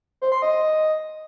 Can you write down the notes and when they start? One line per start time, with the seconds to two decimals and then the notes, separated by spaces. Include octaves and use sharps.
0.22 C5
0.32 C6
0.42 D#5